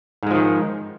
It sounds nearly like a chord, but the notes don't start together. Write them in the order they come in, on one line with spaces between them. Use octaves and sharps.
G#2 G#3 F3 D#3